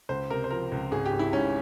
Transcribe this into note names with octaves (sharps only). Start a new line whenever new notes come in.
C#2 C5
C3 A#4
C5
F3 A#4
C#2
G#1 G#4
G4
G#1
E4
G#2 C#4